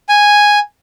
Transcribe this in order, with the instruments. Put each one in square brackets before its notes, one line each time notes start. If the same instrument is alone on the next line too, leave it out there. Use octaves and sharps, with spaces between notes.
[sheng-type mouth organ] G#5